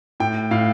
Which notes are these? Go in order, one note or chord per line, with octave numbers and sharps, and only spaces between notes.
A2 G5
A2 F5